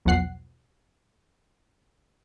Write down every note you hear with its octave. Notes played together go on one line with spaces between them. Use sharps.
B1 E2 F3 F#5 F#6 C7